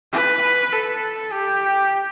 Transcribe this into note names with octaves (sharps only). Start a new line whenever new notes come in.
B4
A4
G4